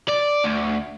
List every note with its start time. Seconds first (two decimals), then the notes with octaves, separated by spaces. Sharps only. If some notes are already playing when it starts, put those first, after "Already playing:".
0.09 D5
0.44 D2